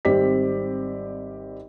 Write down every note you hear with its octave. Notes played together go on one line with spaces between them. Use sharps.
G#1 G3 C4 G4 D5 B6